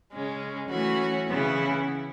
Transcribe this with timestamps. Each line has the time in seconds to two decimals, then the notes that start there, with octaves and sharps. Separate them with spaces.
0.12 C#3 G#3 C#4
0.69 E3 A3 C#4 F#4 C#5
1.26 C#3 E3 B3 E4